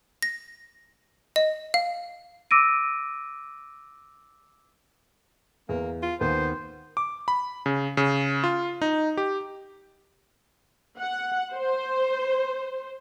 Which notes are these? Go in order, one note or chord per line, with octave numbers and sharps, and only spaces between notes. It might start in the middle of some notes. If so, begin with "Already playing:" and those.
A#6
D#5
F5
D6 E6 A#6 D7 D#7
E2 A#3
F4
D#2 B3 C5
D6
B5
C#3
C#3
F4
D#4
G4
F#5
C5